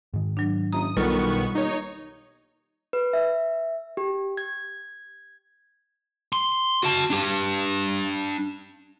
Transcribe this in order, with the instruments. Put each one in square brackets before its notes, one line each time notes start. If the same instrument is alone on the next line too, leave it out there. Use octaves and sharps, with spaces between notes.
[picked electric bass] G#2 D#3
[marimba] F#3 D4
[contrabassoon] F#1 [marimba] A#5 [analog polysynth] D#6
[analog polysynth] B1 B3 C#6 [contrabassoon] D#3 [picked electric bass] G3 [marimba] F4 A4 A#4
[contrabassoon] D#2 [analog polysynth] D#4 C#5
[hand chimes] B4
E5
G4
G#6
[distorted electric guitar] C6
F#4 A5
D4 G4